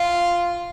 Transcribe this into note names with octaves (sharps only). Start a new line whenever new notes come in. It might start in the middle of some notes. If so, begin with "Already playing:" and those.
Already playing: F4